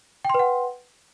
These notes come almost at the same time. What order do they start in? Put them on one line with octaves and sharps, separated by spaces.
G5 C6 B4 F#5